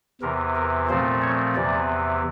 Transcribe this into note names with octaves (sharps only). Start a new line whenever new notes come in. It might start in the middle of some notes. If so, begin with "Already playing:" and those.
E2 C3 E3 A#4
A#4
A#2 F3 A3 C4 C5
C#5
E2 C3 E3 D5